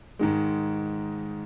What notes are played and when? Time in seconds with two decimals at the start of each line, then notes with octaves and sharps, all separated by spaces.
0.19 G#2 D#3 G#3